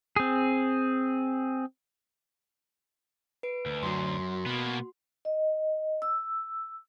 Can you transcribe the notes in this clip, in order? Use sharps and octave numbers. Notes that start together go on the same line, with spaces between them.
C4 G#4
B4 D7
D2
F#2 F#4 C6
B2 A#3 B3
D#5
E6